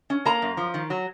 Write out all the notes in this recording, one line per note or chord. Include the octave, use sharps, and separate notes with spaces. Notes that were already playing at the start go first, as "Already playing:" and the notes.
C#4
A#3 A#5
F#2
F3
D#3
F#3